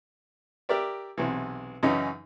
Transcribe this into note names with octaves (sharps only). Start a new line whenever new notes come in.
G4 A#4 D5 E5
B1 C3 E3
F#2 C#3 E3 C#4 D#4